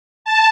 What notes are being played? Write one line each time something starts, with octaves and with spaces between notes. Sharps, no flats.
A5